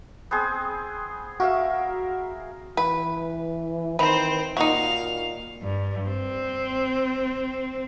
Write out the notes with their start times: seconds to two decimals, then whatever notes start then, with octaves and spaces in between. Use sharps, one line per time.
0.31 B3 C4 G#4
1.40 F#4 A#4 E5 F5
2.77 E3 B4
3.99 D#3 C4 B4 C5 A#5
4.57 A#2 D#4 F#4 F5
5.62 G2
6.09 C4